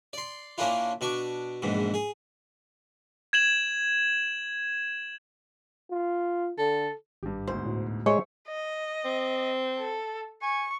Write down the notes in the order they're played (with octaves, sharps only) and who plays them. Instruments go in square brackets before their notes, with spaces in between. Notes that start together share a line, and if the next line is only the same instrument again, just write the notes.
[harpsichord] D5 C6
A#2 A#3 C#4 D4 E4 F4
B2 D4 C#6 D6
A#1 E2 G#2 B2
G#4
[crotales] G#6 E7 F#7
[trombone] F4
[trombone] D3 [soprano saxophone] A4
[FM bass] G#1 [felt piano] G2 G4
[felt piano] D2 G#2 B2 [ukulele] C5
[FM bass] A2
[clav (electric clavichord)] G#3 [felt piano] C5 E5 C#6 [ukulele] C#5
[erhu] D#5
[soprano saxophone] C4
[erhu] A4
[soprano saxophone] G#5 [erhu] C#6